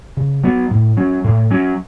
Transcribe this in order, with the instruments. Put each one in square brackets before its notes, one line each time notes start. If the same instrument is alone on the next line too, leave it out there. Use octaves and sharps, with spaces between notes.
[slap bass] C#3
F#3 B3
A2
F#3 C#4
A2
F#3 C#4